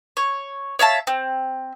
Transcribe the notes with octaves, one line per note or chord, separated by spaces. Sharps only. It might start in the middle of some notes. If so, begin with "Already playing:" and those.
C#5
C#5 E5 F5 A5
C4